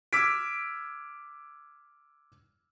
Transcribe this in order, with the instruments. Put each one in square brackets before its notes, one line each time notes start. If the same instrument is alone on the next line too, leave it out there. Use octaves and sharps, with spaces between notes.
[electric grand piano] D6 E6 F6 G#6 B6 D7